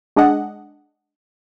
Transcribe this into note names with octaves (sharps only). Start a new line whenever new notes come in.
G#3 D4 G#4 D#5 F#5